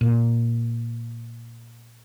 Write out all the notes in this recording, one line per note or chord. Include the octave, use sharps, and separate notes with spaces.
A#2